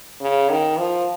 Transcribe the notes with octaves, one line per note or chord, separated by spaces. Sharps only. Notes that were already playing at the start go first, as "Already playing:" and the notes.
C#3
D#3
F3